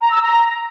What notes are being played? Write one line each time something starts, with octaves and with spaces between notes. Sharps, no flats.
A#5
E6
A#5